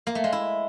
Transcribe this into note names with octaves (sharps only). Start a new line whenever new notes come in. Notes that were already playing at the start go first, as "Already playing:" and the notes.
A#3
A3
G#3
E4